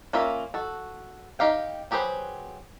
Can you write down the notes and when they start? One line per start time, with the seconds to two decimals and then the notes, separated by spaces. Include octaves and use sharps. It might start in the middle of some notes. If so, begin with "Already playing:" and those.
0.13 A#3 C#4 F4 A#4 E5
0.54 F#4 A4
1.39 D#4 G4 F5 G5
1.91 F#3 G4 G#4 B4 C5